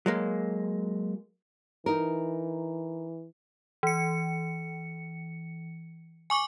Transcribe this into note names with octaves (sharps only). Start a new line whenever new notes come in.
F#3 G#3 A#3
E3 D#4 A#4
E3 C#7
G#5 C#6 D6